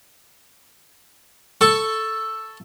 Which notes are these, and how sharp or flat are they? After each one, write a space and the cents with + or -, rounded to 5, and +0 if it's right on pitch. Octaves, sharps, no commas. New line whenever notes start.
A4 +0 C#6 +0